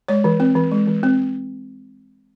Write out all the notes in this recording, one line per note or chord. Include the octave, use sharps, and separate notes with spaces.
G#3 C#5
E3
C4
E3
G#3
E3
C4